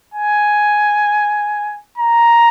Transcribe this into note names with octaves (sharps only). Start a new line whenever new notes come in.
G#5
A#5